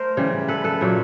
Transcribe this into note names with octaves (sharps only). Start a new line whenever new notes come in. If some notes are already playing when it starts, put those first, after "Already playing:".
Already playing: A3 A#4 C5
C#3 E3 G3
A4 B4
A4 B4
A#2 F#3 A#3